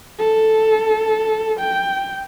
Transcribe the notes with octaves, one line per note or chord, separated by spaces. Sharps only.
A4
G5